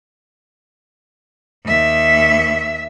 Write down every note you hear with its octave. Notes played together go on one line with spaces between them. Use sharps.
D#2 E5